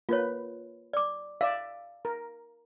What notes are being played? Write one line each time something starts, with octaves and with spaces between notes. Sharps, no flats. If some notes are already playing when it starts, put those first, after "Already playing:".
A#3 F4 B4 C#5
D5 D6
D5 E5 F5
A#4